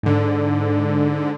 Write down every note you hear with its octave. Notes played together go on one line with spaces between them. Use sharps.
G#2 D3